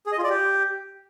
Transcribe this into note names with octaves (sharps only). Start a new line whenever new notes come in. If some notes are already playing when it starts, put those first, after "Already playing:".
G#4
D#5
F4
D5
G4